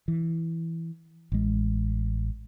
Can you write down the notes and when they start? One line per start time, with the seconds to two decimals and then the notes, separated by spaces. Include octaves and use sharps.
0.08 E3
1.32 A1 G#3